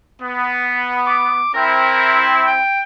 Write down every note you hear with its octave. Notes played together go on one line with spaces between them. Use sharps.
B3
D6
C4 E4 A#4
G5